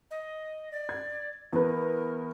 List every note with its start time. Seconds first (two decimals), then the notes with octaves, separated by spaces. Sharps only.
0.11 D#5
0.72 D5
0.89 G#6
1.53 E2 A#4 B4